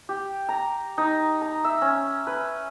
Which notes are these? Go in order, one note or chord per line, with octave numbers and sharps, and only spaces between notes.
G4
A#5
D#4
A#5
E5
C#4
B4